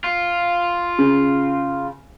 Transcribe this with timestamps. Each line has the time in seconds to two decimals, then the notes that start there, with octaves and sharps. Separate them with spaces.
0.04 F4
0.99 C#3